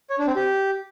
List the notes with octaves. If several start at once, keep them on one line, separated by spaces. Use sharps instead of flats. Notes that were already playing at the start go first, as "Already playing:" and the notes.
C#5
D4
C4
G4